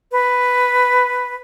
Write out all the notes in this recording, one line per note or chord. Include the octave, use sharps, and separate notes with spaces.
B4